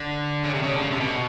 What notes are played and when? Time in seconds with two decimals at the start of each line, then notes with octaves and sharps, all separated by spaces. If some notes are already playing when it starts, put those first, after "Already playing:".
Already playing: D3
0.44 C#3
0.54 C3
0.63 C#3
0.72 D3
0.82 C#3
0.91 C3
1.00 B2